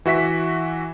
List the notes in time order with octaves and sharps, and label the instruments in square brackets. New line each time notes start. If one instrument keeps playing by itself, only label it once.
[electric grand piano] E3 F#4 E5 B6